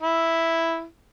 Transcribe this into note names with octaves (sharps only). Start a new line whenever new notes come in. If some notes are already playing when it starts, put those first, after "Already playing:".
E4